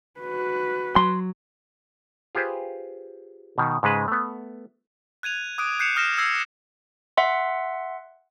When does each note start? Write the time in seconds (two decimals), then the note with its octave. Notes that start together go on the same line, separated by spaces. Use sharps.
0.21 F#4 B4
0.96 F#3 C6
2.35 F4 G4 G#4 B4 C5
3.58 B2 D#3
3.83 G#2 C#3 G#3 B4
4.08 A3 B3
5.23 F#6 G#6 D#7 F7
5.58 D6 D#6 F#6 D7 D#7
5.79 F#6 G6 C7 C#7 E7 F7
5.96 D#6 F6 A#6 C7 E7
6.18 E6 G#6 A#6 C7
7.17 E5 F#5 C6